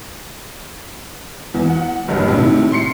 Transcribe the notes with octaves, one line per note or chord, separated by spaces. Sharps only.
E2
F#5
F#1 C#2 G2
A2 C3 D#3
C6 C7 C#7